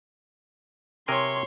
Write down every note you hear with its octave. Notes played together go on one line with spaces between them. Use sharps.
C3 A#4 C#5 G#5 C6